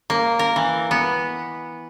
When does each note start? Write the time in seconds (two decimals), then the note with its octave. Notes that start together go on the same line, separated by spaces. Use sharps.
0.10 A#3
0.39 A#4
0.56 E3
0.91 B3